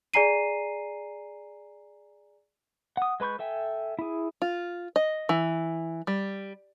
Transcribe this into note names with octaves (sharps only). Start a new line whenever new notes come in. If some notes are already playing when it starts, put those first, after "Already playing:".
G#4 D5 G#5 A#5 C7 D#7
F#5 D#6
G#3 B4 B5 C#6 G6
A4 E5 G5 G#5
E4 G#4
F4
D#5
E3
G3